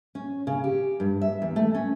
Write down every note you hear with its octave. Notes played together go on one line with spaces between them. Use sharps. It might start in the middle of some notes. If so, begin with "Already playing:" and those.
C#4
C#3
G4
G2
E5
E2
A3
C#4